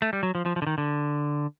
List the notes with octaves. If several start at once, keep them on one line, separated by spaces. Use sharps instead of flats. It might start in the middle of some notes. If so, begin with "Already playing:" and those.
A3
G3
F#3
F3
F3
F3
D3
D#3
D3